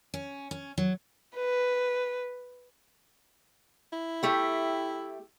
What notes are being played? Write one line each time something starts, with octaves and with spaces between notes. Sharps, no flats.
C#4
C#4
F#3
B4
E4
A3 G4